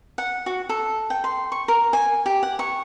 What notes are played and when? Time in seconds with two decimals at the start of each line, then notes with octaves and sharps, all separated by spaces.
0.18 F#5
0.46 F#4
0.69 A4
1.10 G5
1.24 C6
1.52 C#6
1.68 A#4
1.93 G#5
2.26 G4
2.43 F#5
2.59 C#6